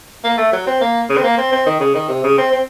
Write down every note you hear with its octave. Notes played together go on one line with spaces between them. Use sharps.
A#3
A3
F#3
C4
A#3
C#3
C4
A#3
C4
C4
D#3
C#3
D#3
C3
C#3
C4
C4